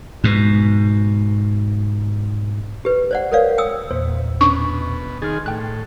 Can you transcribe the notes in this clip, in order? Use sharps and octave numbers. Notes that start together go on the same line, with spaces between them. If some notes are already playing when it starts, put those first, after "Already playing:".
G#2 B2
G4 B4
C5 D5 F#5
A#4 B4 C#5 D5 F5
G5 D#6 E6
E2 A#2 C5
B2 C#4 D4 C#6 D6
D#3 G#4 C6 F6 A6
A2 G5 F#6